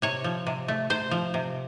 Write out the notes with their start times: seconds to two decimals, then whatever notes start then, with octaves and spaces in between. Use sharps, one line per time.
0.02 C3 C#5
0.24 F3
0.47 C3
0.68 A3
0.90 C3 C5
1.11 F3
1.34 C3